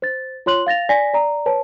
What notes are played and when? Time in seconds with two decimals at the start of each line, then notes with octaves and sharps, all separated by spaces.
0.02 C5 A6
0.46 F4 C#5 C6 F#6 F#7
0.67 F5 A6 A#6 F7
0.89 D5 G#5 A#6 B6
1.14 D5 A#5
1.46 B4 C#5 A5